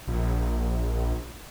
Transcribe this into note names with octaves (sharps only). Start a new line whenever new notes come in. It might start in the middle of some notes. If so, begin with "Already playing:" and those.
A#1